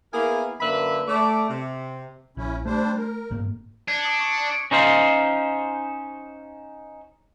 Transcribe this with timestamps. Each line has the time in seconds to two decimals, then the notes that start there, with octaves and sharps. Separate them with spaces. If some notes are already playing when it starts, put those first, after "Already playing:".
0.13 A#3 B3 E4 G#4 A#4 G#5
0.61 F#2 D3 A#3 B4 E5 B5
1.08 A3 D5
1.49 C3
2.37 A#1 C#4 E4
2.65 G3 A3 D4 C5
2.97 A#4
3.31 G1 G#2 A#3
3.88 D4 G#6 C#7
4.05 D6 D#6
4.20 C#6 C#7
4.71 C#4 D#4 C5 F5